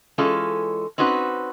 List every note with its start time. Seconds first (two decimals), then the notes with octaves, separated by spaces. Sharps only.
0.18 E3 G#3 C#4 F4 A4
0.98 C4 C#4 D#4 F#4 B4